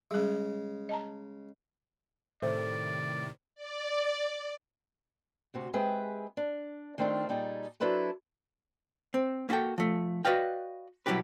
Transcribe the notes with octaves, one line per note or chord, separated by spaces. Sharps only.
C#3 G3 G#3 G#4
D#5 A5 A#5
A2 C3 D#3 A3 C5 D5
D5
D2 C3 F#4
G#3 C4 G4 G#4 B4 E5
D4
D#3 A3 C4 D4 D#4 F4
A#2 G3 D#4 G#4 A4
F#3 D4 E4 A4 B4 C5
C4
A#3 E4 F#4 A4 G5
F3 A3
F#4 B4 D5 D#5 F5 G5
B1 F#3 G3 E4 G4 B4